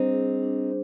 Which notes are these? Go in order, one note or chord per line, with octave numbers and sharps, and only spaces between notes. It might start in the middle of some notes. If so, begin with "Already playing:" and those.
Already playing: G3 C4 D4 D#4 G#4 C5
G#4
D4